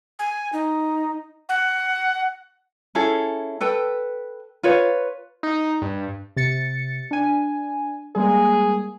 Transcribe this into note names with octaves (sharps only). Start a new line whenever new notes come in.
G#5
D#4
F#5
C#4 E4 G#4 A4
A4 B4 G5
F4 B4 C#5
D#4
G2
C3 A6 C#7
D4 G#5
G3 G#3 A#3 G#4